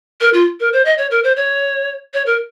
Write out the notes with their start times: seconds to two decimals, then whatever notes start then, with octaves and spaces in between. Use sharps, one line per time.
0.21 A#4
0.34 F4
0.60 A#4
0.73 C5
0.85 D#5
0.98 C#5
1.11 A#4
1.24 C5
1.36 C#5
2.14 C#5
2.26 A#4